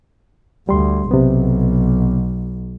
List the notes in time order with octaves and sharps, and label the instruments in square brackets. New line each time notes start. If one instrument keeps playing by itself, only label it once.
[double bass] D2 [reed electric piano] G3 C6
[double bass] B1 [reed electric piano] C3 B3